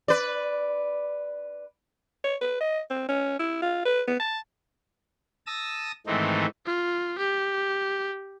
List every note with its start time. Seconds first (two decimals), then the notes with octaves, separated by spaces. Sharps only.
0.08 B4 D5
2.24 C#5
2.41 B4
2.60 D#5
2.90 C4
3.09 C#4
3.39 E4
3.62 F4
3.85 B4
4.07 B3
4.20 A5
5.47 A5 D#6 E6 A#6
6.07 G#2 D#3 E3 A3 C4 D#4
6.66 F4
7.19 G4